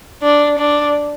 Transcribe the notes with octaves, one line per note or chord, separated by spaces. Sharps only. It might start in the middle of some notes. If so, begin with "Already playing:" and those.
D4
D4